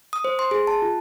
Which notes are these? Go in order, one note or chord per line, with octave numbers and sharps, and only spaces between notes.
D#6
C5
C6
G#4
A5
F4